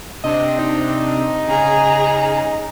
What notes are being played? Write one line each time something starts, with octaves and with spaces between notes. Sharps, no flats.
C3 C4 D4 D#5
D#4
C#3 G#4 A#5